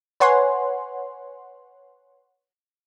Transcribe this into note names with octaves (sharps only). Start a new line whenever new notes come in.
B4 C#5 F#5 G#5 C6